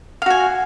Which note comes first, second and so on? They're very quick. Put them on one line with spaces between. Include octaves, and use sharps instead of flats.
F5 F#4 G#5